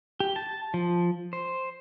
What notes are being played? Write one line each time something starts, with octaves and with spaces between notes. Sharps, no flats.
G4
A5
F3
C5